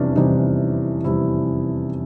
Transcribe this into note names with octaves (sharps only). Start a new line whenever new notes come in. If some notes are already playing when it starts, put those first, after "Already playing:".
Already playing: F1 E2 C3 E3 G3 C#4 D4
F1 E2 C3 E3 G3 D#4
F1 E2 C3 E3 G3 E4